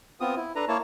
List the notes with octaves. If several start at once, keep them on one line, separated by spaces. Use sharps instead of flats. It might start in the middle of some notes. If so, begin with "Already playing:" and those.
B3 C4 F4 D#6
E4
D4 A4 B4 A#5
A#3 E4 C#5 A5